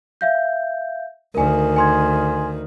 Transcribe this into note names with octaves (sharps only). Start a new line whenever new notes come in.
E5 F5 G6
D2 D#3 A#4 G#5
G#5 C6 G#6